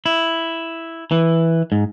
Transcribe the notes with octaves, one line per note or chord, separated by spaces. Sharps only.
E4
E3
G#2